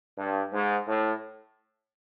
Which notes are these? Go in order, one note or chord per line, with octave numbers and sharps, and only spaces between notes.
G2
G#2
A2